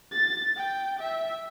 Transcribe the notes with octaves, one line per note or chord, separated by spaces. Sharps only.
A6
G5
E5